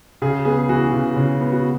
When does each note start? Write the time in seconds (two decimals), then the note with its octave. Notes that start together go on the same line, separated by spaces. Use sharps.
0.22 C#3 G#4
0.45 B3 G#4
0.59 G#4
0.69 E3 F#4
0.93 C#3
1.16 C#3
1.41 B3
1.52 F#4